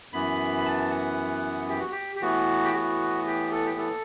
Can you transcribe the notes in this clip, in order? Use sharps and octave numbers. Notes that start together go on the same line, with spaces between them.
F#2 E3 B3 B5
B5
A5
F#5
G4
F#4
G4
G4
A2 E3 B3 F#4
G4
F#4
G4
A4
G4
A4